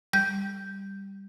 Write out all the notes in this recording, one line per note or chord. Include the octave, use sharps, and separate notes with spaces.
G3 G6